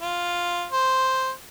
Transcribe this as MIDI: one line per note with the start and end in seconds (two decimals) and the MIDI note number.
0.01 0.66 65
0.72 1.30 72